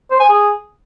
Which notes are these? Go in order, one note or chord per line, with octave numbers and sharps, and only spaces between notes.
C5
G#5
G#4